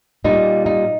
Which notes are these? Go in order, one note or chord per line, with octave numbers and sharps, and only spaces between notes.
A#2 G3 A#3 D#4
D#4